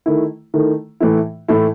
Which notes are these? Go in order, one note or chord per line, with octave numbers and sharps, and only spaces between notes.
D#3 A3 E4
D#3 A3 E4
A2 E3 A3 E4
A2 E3 A3 E4